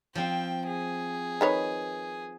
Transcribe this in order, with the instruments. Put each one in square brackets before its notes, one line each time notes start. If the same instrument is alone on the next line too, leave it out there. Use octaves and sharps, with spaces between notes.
[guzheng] F3 C4 [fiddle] G5
[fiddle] G#4
[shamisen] D#3 B4 C#5